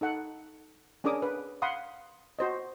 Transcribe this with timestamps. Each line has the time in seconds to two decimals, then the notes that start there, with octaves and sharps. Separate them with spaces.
0.01 D#4 A4 F#5
1.04 C#4 D4 G#4 A#4 D6 D#6
1.22 B4
1.62 F5 F#5 B5 C6 D#6
2.39 F#4 C5 D#5